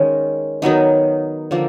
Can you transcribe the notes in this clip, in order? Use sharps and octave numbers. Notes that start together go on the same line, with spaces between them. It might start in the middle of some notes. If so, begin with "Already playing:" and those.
Already playing: D#3 G#3 C#4
D#3 F#3 B3 D#4
D3 F3 A#3